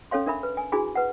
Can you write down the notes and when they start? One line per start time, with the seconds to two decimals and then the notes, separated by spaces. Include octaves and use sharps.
0.11 C#4 A4 C#5 F5 C6
0.26 D4 A#4 E5 B5
0.43 B4
0.57 G#5
0.72 D4 E4 F#4 G#4 G#5 B5
0.95 B4 F#5